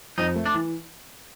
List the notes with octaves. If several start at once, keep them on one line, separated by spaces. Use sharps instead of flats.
F2 D#4
A3
D4
E3